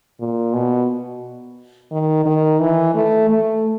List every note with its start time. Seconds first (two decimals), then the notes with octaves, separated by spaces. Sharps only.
0.20 A#2
0.53 B2
1.92 D#3
2.25 D#3
2.60 E3
2.94 A3
3.29 A3